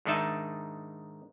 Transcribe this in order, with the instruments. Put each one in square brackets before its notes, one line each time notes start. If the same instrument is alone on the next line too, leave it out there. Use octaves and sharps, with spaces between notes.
[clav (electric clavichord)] G#2 D#3 D4 D#4 E5 A5